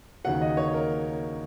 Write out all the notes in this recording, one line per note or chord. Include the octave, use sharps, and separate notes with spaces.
D#2 C#3 F#3 F#5
D#5
C#5
A#4